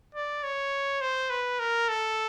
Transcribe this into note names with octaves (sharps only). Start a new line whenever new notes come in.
D5
C#5
C5
B4
A#4
A4